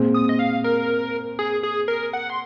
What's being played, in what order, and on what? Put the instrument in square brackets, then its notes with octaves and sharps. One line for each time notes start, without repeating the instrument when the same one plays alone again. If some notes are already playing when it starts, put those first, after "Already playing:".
Already playing: [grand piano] A#2 G#3 C4
[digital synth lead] D#6
D#5
F5
A#4
G#4
G#4
A#4
F#5
C6